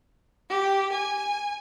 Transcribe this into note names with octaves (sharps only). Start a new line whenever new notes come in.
G4
G#5